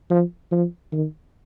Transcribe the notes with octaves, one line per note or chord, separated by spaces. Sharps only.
F3
F3
D#3